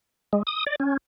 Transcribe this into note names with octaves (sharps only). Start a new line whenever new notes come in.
G#3
D#6
D5
C#4